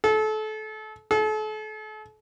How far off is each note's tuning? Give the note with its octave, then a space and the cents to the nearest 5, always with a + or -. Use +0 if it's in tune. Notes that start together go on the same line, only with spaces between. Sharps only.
A4 -30
A4 -40